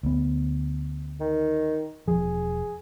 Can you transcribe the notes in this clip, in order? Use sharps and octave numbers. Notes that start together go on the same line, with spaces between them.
D2 B3
D#3
E1 F3 G#4